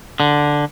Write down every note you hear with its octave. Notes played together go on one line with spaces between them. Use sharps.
D3